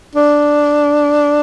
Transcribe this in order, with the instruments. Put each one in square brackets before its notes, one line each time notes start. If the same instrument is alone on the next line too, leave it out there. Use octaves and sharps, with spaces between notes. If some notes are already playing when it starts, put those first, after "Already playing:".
[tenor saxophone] D4